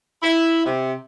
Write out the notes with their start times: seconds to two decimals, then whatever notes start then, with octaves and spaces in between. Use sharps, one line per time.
0.23 E4
0.64 C3